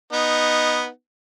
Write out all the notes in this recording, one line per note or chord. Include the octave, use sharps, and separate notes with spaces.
B3 D#4